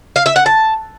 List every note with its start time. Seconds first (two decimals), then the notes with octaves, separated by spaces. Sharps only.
0.16 F5
0.26 E5
0.36 F#5
0.46 A5